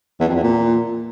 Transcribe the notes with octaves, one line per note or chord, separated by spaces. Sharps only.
E2
F2
E2
A#2